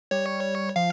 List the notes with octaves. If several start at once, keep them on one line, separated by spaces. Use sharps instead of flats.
G3 C#5
F3 F5